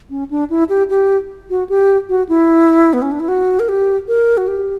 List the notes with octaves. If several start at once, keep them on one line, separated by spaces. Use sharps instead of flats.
C#4
D4
E4
G4
G4
F#4
G4
F#4
E4
B3
C#4
D4
E4
F#4
A#4
G4
A#4
F#4
G4